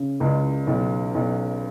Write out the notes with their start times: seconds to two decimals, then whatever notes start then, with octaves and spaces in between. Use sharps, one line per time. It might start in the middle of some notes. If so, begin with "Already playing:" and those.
Already playing: C#3
0.20 C#2
0.67 B1
1.14 B1